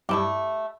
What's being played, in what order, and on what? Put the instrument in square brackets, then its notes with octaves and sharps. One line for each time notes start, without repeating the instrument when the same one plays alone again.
[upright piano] G2 [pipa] A3 E4 G4